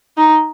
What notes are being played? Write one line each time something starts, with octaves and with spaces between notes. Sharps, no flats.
D#4